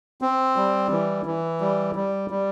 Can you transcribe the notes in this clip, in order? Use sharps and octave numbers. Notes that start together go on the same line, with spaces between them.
C4
G3
E3
E3
G3
G3
G3